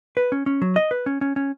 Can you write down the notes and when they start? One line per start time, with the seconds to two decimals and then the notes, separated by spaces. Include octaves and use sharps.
0.17 B4
0.32 C#4
0.46 C#4
0.62 F#3
0.76 D#5
0.91 B4
1.06 C#4
1.21 C#4
1.36 C#4